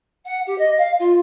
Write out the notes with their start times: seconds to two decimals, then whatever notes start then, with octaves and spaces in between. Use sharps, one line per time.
0.25 F#5
0.46 G4
0.58 D#5
0.77 F5
0.99 F4